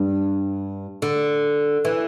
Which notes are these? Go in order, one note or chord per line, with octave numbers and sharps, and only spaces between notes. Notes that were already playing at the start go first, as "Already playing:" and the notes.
Already playing: G2
D3
E3